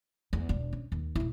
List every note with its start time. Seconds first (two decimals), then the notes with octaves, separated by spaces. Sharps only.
0.33 E2
0.49 E1 D4
0.73 C#4
0.92 D#2
1.15 D#1 E4